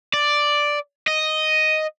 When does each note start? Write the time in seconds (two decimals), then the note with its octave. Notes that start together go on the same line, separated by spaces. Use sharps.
0.14 D5
1.08 D#5